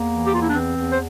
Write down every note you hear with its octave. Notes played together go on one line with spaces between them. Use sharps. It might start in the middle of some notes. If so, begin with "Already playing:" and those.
Already playing: E2 A#3
E3
G4
E2 F4
E4
D4
E3 C4
E2
C5